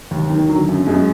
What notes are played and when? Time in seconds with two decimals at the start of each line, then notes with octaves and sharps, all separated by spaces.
0.11 D#2
0.30 D#3
0.49 D3 F#3
0.69 F#2
0.87 F#2 G#3